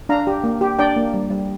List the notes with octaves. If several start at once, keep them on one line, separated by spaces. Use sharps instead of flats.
D4 F5 A#5
G4
A#3
G4
D4 D5 G5
A#3
G3
G3